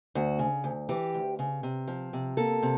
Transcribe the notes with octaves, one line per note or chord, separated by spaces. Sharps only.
D2 F#4
C#3
D2
E3 G4
D2
C#3
C3
F3
C3
A#3 A4
C3